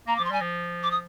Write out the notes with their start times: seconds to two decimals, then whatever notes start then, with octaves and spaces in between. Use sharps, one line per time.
0.07 A#3 A#5
0.16 D6
0.19 F3
0.25 C6
0.30 G3
0.33 G#5
0.41 F3
0.83 D6
0.91 D#6